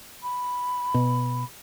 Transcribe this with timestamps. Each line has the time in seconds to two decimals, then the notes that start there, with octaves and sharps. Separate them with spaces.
0.23 B5
0.94 B2